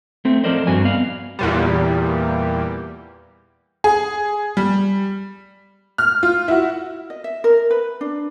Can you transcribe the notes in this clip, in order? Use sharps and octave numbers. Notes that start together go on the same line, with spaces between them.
A3 C4
F3 A4 A#4 C5 D5 D#5
G2 C4 F#4 G#5
B3 D5 F5
E2 A#2 G3
G#4
G3
F6
F4
E4 F#4
D#5
E5
A#4
B4
D4